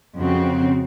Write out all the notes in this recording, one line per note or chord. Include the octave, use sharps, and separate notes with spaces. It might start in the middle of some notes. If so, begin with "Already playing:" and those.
F2 C#3 C4 F#4